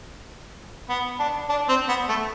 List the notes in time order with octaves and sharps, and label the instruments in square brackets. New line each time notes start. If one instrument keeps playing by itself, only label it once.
[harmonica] B3
D4
D4
C4
B3
A3